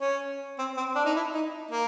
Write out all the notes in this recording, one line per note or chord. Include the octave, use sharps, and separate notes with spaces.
C#4
C4
C4
D4
D#4
E4
D#4
A#3